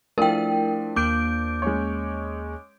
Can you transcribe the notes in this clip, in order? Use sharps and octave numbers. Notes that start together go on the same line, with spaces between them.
F3 A3 D4 E4 A#4 G5
D#2 A#3 D6 G6 D7
G#3 C#4 C#5